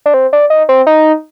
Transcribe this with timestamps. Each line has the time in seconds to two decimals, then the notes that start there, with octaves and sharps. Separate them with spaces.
0.06 D4
0.14 C4
0.33 D4
0.50 D#4
0.69 C4
0.87 D#4